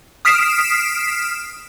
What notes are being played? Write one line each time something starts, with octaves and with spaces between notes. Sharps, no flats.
D#6 F6 B6 C7 D7 E7